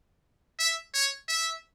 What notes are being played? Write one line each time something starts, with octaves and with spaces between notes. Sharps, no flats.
E5
C#5
E5